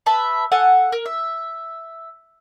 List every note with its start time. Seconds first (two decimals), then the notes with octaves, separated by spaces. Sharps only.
0.06 B4 E5 A5 B5
0.52 A4 F5 F#5 G#5
0.92 A#4
1.06 E5